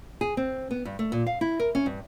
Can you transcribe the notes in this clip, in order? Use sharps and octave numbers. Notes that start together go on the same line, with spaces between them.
G#4
C4
B3
G2
A3
A#2
F5
E4
A#4
C#4
G2